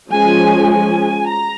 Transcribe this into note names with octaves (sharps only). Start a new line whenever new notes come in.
F3 G#3 C#4 G#5
G#5
A#5